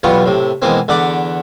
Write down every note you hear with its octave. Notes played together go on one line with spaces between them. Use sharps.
B1 E2 G3 B3 F4 C#6
A2 C3
B2 E3 G#3 A#3 C4
E2 D3 D5 F#5 B5 D6